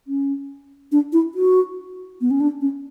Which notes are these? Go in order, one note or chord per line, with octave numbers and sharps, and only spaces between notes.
C#4
D4
E4
F#4
B3
C#4
D4
C#4